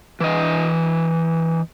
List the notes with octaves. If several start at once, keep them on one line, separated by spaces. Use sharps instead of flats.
E3 D#5